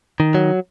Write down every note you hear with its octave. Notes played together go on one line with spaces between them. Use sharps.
D#3
F#3